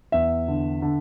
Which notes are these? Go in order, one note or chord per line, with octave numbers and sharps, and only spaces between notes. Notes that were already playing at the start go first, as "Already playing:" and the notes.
E2 E5
D3
D3